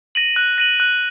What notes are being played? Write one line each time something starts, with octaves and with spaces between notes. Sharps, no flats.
A#6 D#7 F#7
F#6
A#6 D#7 F#7
F#6